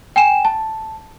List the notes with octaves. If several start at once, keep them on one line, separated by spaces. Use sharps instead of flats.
G5 G#5 E7
A5